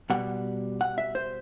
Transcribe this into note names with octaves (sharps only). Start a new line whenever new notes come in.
B2 G3 F#5
F#5
E5
C5